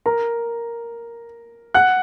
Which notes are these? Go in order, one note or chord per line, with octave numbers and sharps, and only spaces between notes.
A#4 A#5
F#5 F#6